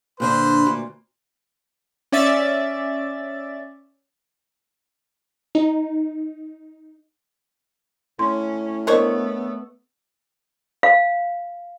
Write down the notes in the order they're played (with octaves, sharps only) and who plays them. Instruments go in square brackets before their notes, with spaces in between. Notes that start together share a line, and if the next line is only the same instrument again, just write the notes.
[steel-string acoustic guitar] A#2 D3 D4 [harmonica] B4 C5
[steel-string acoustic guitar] D2 A#2
[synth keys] C#4 D5 E5 A6
[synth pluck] D#4
[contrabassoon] A2 [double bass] C#4 [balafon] C6
[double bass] A3 B3 [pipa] D4 C5 C#5 [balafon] A#4 D#5
[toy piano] F5